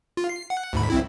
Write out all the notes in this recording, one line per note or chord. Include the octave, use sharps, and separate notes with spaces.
F4
C7
F#5
D2 G#2 B5
C2 C4 E4